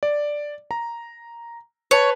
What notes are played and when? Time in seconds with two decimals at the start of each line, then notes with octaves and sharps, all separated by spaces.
0.03 D5
0.71 A#5
1.91 B4 C#5 A5